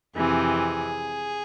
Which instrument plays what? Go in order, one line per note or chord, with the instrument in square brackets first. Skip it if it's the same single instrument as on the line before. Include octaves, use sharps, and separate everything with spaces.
[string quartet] F2 C3 E3 G#4